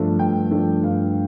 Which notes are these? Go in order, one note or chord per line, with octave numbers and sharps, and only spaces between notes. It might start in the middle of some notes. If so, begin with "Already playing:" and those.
Already playing: G2 F3 A3 D4
G2 G5
F3 A3 D4
G2 F5